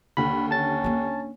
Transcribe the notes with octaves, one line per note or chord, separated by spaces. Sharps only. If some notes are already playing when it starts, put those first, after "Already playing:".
D#2 D3 B5
C#4 A5 A6
A#3 D4